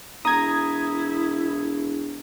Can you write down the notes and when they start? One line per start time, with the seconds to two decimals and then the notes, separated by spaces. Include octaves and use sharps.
0.25 E1 E4 A#5 D#6 G#6